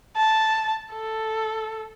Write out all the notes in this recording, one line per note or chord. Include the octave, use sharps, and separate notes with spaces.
A5
A4